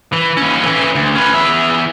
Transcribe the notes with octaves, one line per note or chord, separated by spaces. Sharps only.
E3
D#2 C#4
E3 C#4
D2
C#4 B4
E2 E5